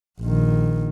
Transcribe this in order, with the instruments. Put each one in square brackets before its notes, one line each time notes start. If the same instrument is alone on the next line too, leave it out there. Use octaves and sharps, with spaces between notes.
[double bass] A#1 D#3